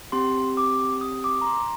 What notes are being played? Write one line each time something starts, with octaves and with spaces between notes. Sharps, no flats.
C4 G4 C6
D6
D#6
D6
A#5
C6